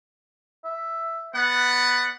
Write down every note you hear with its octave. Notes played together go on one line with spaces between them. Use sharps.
E5
B3 B4 D5 F#5